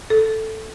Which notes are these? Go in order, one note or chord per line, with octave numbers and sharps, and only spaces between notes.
A4